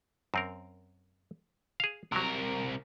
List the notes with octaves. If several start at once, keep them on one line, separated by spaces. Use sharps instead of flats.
F#2 C4 A#4
G#4 F5
C2 C3 F#3 A#4